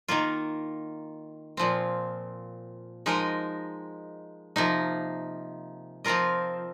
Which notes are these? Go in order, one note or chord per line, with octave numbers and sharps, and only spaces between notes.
D#3 A#3 F4
A#2 F3 C4
F3 G#3 D#4 A#4 D#5
C3 F3 A#3 D#4
F3 C4 F4 A#4 D#5